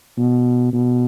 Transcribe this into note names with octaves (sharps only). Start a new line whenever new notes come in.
B2
B2